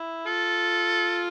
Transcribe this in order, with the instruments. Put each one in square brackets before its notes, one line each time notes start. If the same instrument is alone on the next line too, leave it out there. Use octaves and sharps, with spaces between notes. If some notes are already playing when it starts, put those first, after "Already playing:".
Already playing: [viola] E4
[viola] F4 [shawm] A4